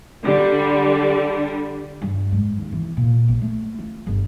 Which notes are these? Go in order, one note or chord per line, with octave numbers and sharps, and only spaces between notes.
D3 G3
G2
G#2
D#2
E3
A#2
A#1
A3
F4
G1